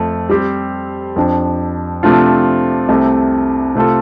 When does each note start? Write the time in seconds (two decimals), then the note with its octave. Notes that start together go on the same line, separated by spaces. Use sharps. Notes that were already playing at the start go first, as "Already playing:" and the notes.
Already playing: F2 F3 A3
0.29 G3 C4 G4 C5
1.16 F2 F3 D4
2.03 C3 F3 A3 D4 F4
2.89 C2 C3 A3
3.75 C3 A3 F4 A4